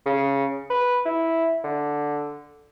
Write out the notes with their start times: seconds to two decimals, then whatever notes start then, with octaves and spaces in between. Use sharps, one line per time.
0.06 C#3
0.70 B4
1.05 E4
1.64 D3